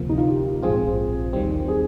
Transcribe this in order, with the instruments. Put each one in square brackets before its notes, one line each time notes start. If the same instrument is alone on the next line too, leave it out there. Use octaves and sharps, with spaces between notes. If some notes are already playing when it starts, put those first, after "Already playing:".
Already playing: [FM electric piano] D2 C3 F3 A#3
[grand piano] D#4
F4
G4
[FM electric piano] A#1 G#2 F3 C4 F4 [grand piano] G#4
[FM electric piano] D#2 D#3 G3 C4
[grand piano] G#4